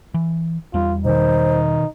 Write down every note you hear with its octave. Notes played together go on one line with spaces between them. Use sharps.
E3
E2 G3 F4
B2 D#3 D#4 C5